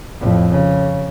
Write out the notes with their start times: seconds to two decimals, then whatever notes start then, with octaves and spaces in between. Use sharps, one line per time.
0.20 F2 A2
0.51 C#3